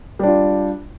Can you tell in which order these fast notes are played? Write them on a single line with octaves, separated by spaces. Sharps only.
G3 D4 F4